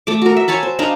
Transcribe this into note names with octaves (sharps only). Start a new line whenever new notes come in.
A3 D6
F#4 A#4
E5
C#5 G#5 A5 B5
C5
D4 D#4 F5